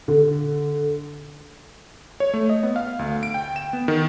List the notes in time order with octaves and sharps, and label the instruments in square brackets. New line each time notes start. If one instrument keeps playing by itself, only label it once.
[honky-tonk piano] D3
[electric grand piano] C#5
A3
D#5
B3
F5
D2
D7
G5
E7
B3
D#3